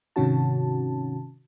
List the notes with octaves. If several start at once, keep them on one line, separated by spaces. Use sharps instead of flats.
G#2 C3 D#3 C#4 F#4 A5